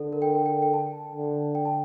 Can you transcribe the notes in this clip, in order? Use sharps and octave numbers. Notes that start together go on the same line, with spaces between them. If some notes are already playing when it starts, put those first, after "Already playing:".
Already playing: D3 A4
A#4
G5
G5
G5
A5
D3
G5
A5